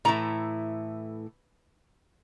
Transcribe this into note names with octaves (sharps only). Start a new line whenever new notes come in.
A2 E3 A3 E4 A#5